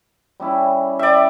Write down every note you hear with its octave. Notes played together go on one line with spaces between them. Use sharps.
G3 C#4 E4
D5 E5 G5